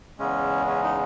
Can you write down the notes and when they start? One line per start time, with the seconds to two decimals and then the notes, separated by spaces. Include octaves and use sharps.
0.19 E2 C#3 G#3 C#4
0.67 C#4
0.83 D#4